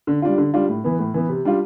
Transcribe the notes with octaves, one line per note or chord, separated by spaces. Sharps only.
D3
G3 D4 F4
D3
G3 D4 F4
A2
E3 B3
A2
E3 B3
C3
G3 D4 F4